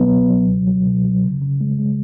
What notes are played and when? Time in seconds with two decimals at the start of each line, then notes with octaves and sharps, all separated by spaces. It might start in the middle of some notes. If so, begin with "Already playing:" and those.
Already playing: B2 F#3 B3
0.11 C#2
0.30 F#3
0.48 C#2
0.67 F#3
0.86 B2
1.04 F#3
1.24 C#3
1.42 C#3
1.61 G#3
1.79 G#3